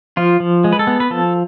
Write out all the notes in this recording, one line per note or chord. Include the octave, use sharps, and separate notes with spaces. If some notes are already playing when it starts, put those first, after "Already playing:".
F3 F4
F3
G#3
B4
A4
B3
B4
F3 A4